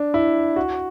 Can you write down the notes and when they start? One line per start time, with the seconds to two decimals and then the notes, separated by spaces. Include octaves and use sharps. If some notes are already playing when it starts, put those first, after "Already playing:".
Already playing: D4
0.14 E4
0.56 F#4